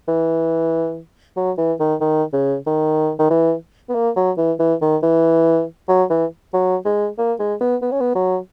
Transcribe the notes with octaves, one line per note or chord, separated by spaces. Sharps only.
E3
F#3
E3
D#3
D#3
C#3
D#3
D#3
E3
B3
A#3
F#3
E3
E3
D#3
E3
F#3
E3
F#3
G#3
A#3
G#3
B3
B3
C#4
B3
F#3